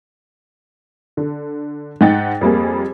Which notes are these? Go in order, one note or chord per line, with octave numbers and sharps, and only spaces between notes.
D3
G#2 D#4 F#5 G5 A6
F2 G3 A#3 G#4